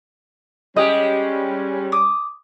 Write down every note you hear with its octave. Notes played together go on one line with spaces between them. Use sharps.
G3 G#3 C#4 G4 D#5
D6 D#6